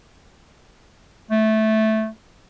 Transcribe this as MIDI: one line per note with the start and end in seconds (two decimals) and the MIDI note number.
1.31 2.08 57